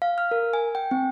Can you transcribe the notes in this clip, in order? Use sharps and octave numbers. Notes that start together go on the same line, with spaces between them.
F5
F6
A#4
G#5
G5
C4